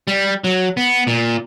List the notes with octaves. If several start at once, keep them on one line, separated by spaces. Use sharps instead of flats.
G3
F#3
B3
A#2